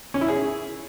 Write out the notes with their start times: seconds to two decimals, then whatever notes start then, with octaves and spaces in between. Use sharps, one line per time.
0.14 C#4
0.21 E4
0.28 G#4